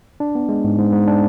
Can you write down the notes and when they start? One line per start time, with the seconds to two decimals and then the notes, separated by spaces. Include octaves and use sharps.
0.20 D4
0.35 B3
0.49 G#3
0.64 G#2
0.79 G#2
0.93 G#2
1.07 D4